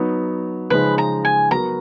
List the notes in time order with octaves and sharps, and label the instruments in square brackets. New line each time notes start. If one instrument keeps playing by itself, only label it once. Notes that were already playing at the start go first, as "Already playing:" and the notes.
Already playing: [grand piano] F#3 B3 D#4
[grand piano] C#3 F3 G#3 D#4 [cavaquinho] B4
[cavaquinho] A#5
G#5
[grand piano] F#3 B3 F#4 A#4 [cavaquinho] A#5